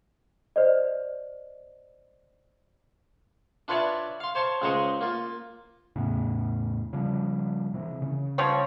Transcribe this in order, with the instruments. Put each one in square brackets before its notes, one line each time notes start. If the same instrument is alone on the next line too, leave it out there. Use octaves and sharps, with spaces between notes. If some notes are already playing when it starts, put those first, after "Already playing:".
[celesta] C5 D5 D#5
[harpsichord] D4 F4 B4 C#5 D5 E5
F5 C6
C5 C#5 A5 C6 C#6
C#2 G#3 C5 A#5 C#6 D#6
A#3 F4
[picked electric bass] E2 A2 C#3
C#3 F3 G3
C3 E3
C#3
[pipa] F3 G3 C#5